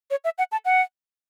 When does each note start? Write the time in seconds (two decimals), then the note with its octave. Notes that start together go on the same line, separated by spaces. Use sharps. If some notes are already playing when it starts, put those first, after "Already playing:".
0.11 C#5
0.24 E5
0.38 F#5
0.52 A5
0.65 F#5